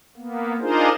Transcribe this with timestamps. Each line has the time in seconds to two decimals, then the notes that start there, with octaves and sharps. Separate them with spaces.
0.18 A#3 B3
0.61 D4 D#4 F4 G#4 A#4 C5